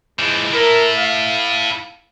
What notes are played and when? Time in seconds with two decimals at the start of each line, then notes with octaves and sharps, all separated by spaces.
0.19 E3 F3 G#3
0.53 E4 A4 A#4
0.98 F5